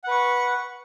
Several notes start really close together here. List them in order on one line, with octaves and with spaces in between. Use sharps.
F#5 B4 C#6